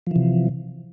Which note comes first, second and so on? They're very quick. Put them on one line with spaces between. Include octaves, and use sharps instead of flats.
F3 E3 C3